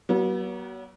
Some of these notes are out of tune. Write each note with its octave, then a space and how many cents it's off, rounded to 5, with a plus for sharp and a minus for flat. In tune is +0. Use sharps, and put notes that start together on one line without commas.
F#3 +30 B3 -40